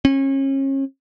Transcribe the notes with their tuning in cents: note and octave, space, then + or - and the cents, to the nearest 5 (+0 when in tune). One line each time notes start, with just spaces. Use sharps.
C#4 -35